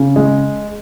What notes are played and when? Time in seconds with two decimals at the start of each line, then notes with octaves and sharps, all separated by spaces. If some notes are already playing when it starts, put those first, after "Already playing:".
Already playing: C#3
0.16 G#3